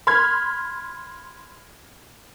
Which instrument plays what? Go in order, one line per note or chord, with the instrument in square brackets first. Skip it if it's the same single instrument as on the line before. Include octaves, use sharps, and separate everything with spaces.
[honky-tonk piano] B5 C6 F6 G#6